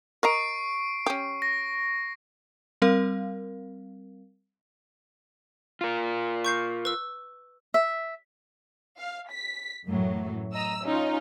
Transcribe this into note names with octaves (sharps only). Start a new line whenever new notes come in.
A#4 D#5 A#5 C#6 C7 D7
C#4 G4
A#6
G3 C4 A#4 F5
F4 A#4
C#6 G6 C7
B4 E6
E5
F5
B6
F#2 A2 E3 F#3
D#5 A#5 E6
C#4 D#4 F4